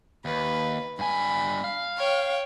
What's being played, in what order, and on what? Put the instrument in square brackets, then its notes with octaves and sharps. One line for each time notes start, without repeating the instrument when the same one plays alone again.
[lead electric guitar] D#2 [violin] B4
[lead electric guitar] G2 G#5 [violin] B5
[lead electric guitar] F5
[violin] C#5 G5